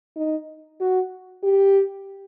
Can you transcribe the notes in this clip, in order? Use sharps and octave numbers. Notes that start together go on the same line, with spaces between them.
D#4
F#4
G4